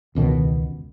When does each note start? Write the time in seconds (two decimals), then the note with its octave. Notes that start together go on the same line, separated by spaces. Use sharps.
0.15 E1 C#2 B2 D#3